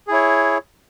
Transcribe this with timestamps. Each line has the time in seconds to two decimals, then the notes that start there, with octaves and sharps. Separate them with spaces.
0.08 G#4
0.11 E4
0.13 C#5